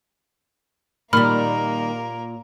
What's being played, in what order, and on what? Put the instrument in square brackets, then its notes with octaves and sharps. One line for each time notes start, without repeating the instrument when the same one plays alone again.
[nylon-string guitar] A#2 [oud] D#3 G3 [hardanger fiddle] A#3 A#4 [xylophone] B5 F6